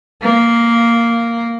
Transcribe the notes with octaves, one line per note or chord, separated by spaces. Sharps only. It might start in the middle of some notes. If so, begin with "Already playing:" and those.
A#3